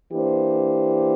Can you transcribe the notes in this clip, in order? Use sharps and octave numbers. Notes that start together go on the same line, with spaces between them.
E3 A#3 D4 G4 C5